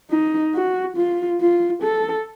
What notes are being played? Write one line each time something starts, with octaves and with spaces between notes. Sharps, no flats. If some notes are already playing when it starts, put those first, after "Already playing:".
D#4
F#4
F4
F4
A4